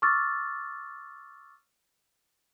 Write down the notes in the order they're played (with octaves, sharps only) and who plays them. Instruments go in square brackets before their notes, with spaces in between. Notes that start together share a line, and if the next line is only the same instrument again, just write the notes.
[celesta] C#6 D6 E6 F6 A6